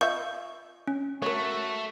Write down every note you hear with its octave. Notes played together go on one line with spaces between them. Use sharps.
F4 D#5 E5 C#6 G6
C#4
A3 F#4 A#4 C#5